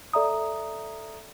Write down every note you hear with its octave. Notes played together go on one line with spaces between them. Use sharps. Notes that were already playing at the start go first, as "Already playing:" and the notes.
A4 D5 E5 A#5 D#6